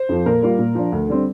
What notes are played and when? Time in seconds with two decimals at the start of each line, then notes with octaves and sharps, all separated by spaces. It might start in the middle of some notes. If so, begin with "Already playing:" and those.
Already playing: C5
0.09 F2 F3
0.26 A#2 A#4
0.42 G3 A#3 F4
0.59 A#2
0.75 F3 D4
0.92 D2
1.08 D3 G3 C4